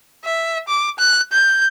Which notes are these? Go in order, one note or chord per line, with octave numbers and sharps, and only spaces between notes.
E5
D6
F#6
G6